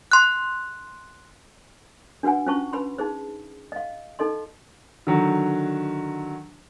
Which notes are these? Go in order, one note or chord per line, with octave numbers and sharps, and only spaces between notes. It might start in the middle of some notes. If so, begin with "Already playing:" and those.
C6 F#6
D4 F#4 B4 F#5 G#5
C#4 F4 C5 A5 C#6
B4 B5 C6
D#4 G#4 C5
D#5 F5
D#4 A4 D#5 C6
D3 D#3 F#3